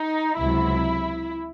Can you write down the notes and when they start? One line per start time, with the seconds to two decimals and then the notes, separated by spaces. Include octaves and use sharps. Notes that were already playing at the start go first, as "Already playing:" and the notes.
Already playing: D#4
0.39 C#2 C3 F#3 E4